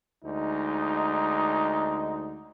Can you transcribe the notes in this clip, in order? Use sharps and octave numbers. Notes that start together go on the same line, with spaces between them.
D2 G#3 D#4